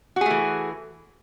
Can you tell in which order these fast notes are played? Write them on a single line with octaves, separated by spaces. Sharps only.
F#4 G#4 A3 E3